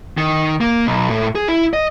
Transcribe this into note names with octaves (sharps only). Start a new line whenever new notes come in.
D#3
A#3
B1
A2
G#4
E4
D#5